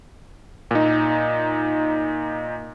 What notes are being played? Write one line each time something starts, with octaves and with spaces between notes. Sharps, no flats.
A#2 D#4